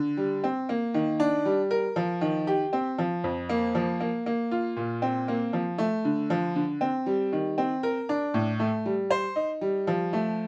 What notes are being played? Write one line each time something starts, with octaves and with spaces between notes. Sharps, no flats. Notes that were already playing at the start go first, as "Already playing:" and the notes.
Already playing: D3
G3
C4
A#3
D#3
D4
G3
A#4
F3
D#3
G4
C4
F3
F2
A#3
F3
A#3
A#3
F4
A#2
C4
A#3
F3
A3
D3
F3
D3
C4
G3
D#3
C4
A#4
D4
A2
A3
G3
C5
D#4
G3
F3
A3